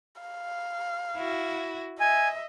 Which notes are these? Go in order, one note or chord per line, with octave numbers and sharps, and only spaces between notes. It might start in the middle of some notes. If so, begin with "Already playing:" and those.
F5
E4 F#4
D#5 E5 G#5